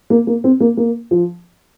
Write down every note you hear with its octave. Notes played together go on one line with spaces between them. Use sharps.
A#3
A#3
C4
A#3
A#3
F3